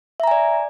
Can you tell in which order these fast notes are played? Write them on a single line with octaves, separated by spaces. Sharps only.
E5 A#5 G#5 D5